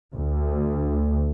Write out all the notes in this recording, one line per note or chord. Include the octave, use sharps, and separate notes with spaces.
D2